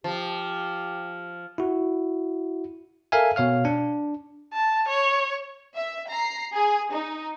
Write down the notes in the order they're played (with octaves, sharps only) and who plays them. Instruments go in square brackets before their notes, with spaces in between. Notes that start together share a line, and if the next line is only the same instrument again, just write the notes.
[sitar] F3 [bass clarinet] G4
[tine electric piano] E4 F#4
A4 A#4 E5 F5 G#5
B2 C#5 F5 F6
D4
[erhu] A5
C#5
[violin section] E5
A#5 C7
G#4
D#4